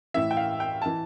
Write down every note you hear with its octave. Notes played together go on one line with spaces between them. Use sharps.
A2 E3 E5
G5
F5
G5
E3 A5